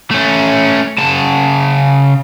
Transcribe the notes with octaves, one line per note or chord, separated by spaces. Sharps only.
A3 C#4
C#3 A5